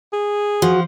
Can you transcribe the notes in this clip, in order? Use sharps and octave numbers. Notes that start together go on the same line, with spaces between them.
G#4
F3 F#4